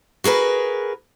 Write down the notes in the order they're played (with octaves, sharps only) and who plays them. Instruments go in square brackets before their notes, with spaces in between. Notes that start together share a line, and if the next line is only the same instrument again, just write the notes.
[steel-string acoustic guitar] F#4 G#4 A#4 B4